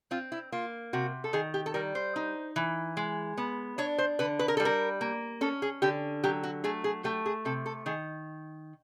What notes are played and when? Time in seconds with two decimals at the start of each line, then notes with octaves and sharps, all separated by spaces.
0.11 C4 F4
0.32 E4
0.52 A#3 F4
0.93 C3 F#4
1.24 A4
1.33 D#3 G#4
1.54 G4
1.66 A4
1.74 G3 A#4
1.95 C5
2.16 D#4
2.56 E3
2.97 G#3
3.37 B3
3.78 D4 C#5
3.98 C5
4.19 D3 B4
4.39 B4
4.48 A#4
4.57 G3 A4
4.65 A#4
5.01 A#3
5.41 C#4 A4
5.62 G#4
5.82 D3 G4
6.24 F#3 G4
6.43 F#4
6.64 A3 G#4
6.84 G#4
7.04 A3 G4
7.26 G#4
7.45 C3 A4
7.66 A4
7.86 D#3 G#4